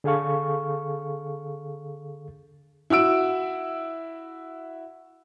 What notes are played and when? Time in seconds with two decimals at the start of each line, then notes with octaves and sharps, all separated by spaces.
0.04 D3 G#4 A4 F5 C#6
2.90 E4 F#4 E6 D7